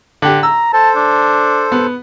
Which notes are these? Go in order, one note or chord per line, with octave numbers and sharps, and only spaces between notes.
D3 G4
A#5 E6
A4 C5 A5
D4
B3